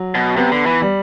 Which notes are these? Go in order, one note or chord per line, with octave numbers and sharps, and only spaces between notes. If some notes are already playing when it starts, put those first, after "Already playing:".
Already playing: F#3
B2
C3 B3
D3
E3
G3